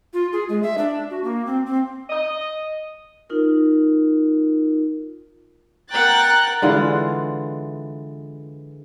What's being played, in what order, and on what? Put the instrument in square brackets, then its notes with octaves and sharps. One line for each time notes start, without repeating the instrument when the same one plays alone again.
[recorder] F4
G#4
G#3
E5
D4
F#4
A#3
C4
C4
[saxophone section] D#5
[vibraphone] D#4 F4 A#4
[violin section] A#4 F#6 A6 [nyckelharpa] F#5 G5
[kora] D3 E3 G#3 F4